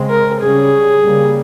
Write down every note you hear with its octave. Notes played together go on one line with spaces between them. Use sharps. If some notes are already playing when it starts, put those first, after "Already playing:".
Already playing: C#3 G#3 C4
A#4
C#3 G3 C#4 G#4
C#3 G3 A#3